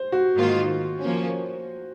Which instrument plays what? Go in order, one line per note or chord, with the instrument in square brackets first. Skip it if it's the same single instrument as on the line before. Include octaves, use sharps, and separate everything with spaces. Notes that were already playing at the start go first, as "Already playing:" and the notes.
Already playing: [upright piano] C5
F#4
[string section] G#2 D#3 A#3 F4
F3 A#3 C#4